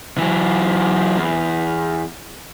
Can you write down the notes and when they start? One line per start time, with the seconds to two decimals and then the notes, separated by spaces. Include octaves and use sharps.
0.18 E3 F#3
1.17 E2